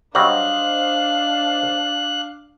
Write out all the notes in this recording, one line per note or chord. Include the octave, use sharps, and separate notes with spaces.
F#3 G3 D4 F#4 C5 D#5 F5 F#6